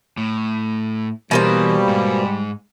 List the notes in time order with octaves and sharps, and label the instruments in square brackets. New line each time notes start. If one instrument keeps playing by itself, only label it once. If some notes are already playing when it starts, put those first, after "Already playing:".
[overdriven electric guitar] A2
[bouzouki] B2 A#3 C5 [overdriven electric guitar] E3 [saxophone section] G3
[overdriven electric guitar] G#2